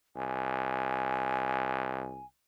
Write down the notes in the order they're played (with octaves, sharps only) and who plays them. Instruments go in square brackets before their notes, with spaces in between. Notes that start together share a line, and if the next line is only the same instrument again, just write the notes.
[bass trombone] C2 [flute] G#5